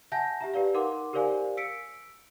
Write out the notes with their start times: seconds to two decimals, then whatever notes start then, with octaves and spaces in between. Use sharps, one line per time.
0.12 E5 F#5 G#5 A5 G6 A#6
0.41 G4 E5 A#5
0.54 G4 B4 D5 F5
0.74 D#4 A#4 F#5 C6 D6
1.13 G4 A#4 C5 D5 F5 G#5
1.57 E6 B6 C#7 D7